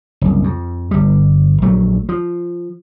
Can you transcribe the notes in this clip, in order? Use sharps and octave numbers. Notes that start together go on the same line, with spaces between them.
F#1 C2
F2
G1 G3
A#1 F#3 A3
F3